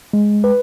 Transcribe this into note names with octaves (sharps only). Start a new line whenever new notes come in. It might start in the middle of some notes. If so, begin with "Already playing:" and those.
G#3
B4